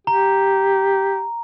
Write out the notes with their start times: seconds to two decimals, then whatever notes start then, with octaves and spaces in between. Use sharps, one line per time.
0.07 G4 A#5